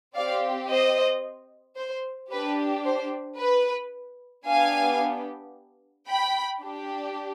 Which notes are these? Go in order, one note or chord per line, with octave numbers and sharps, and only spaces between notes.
C4 G4 D5 F5
C5 D#5
C5
D4 G4 B4
C5
B4
B3 D4 G4 F5 G#5
G5 B5
D4 G4